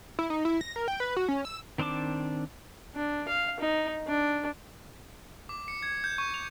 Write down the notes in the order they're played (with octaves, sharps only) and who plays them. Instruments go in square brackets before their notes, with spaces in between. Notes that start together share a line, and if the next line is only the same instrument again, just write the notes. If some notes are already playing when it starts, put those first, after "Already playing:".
[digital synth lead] E4
D#4
E4
A#6
A#4
G5
B4
F#4
C#4
E6
[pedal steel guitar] D#3 C4 D4 A5 D6
[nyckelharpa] D4
F5
D#4
D4
[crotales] D6
C#7
G#6
G6
C#6
F7